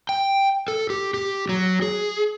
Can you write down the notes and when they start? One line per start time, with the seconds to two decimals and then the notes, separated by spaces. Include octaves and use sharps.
0.09 G5
0.68 A4
0.90 G4
1.14 G4
1.49 F#3
1.82 G#4